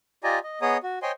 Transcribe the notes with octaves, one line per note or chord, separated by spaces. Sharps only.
F4 G4 D5 D#5 G#5 A#5
D#5
B3 G#4 C#5 D#5 A#5 D#6
F#4
C5 C#5 D#5 G5 G#5 C6